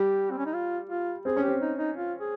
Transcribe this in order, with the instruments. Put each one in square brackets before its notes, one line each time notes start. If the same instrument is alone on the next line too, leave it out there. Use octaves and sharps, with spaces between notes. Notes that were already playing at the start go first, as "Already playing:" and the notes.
Already playing: [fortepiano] G3 [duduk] G4
[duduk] C4
C#4
D#4
F4
F4
[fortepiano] C4 [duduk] G#4
[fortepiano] C#4
[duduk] G4
[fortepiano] C4
[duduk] D#4
D#4
F4
G#4